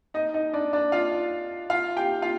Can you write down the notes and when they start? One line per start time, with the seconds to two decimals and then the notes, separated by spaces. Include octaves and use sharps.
0.14 D#4 D#5
0.34 D#4 D#5
0.53 D4 D5
0.73 D4 D5
0.92 F4 F5
1.70 F4 F5
1.96 G4 G5
2.22 F4 F5